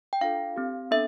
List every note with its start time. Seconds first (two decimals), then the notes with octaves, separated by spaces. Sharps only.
0.13 G5
0.21 D4 F4 A4 F5
0.56 C4 G4
0.91 B3 D4 A4 E5